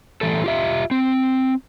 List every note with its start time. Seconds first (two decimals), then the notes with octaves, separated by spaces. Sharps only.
0.21 E3 G3 A3 A4
0.44 F4 G4 E5
0.91 C4